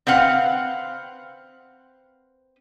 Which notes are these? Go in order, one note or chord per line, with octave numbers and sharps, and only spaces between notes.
C4 B4 F5 F#5